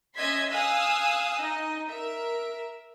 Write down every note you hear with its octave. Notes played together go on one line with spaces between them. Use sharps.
C#4 D#5 E5 C6 G#6 B6
F5 G#5 D#6 E6 F#6
D#4 D#5
A#4 E5